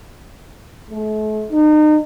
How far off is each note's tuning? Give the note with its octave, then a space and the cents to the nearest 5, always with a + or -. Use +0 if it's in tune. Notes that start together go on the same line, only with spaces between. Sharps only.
A3 -40
D#4 -35